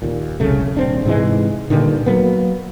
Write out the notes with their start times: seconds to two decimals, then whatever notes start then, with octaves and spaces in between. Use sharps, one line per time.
0.02 D#2 A#2
0.40 F1 C2 C#3 A3
0.77 D#1 C4 D4
1.05 G#2 C3 E3 G#3
1.70 G2 A#2 D3 D#3
2.06 F#3 A#3 B3